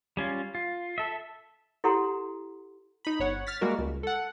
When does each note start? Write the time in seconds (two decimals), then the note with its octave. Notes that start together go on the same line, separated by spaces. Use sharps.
0.17 G3 C#4 F4
0.55 F4
0.98 A4 E5
1.84 E4 G4 A4 F#5 A#5 C6
3.05 D#4 B5
3.20 G1 C#5 F#5
3.47 F6 A6 B6
3.61 G3 G#3 A#3 F#4 A#4
3.79 C#2
4.03 A4 F#5